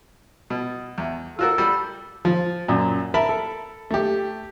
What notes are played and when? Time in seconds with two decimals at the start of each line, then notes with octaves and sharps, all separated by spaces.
0.50 B2
0.98 E2
1.39 F4 F#4 A4 A#4
1.58 G3
2.25 F3
2.68 F#2 A#2
3.14 A#4 E5 A5 B5
3.29 A4
3.91 A3 G4